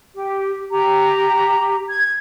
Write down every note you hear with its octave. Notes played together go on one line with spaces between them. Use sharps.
G4
G4 A#5
G#6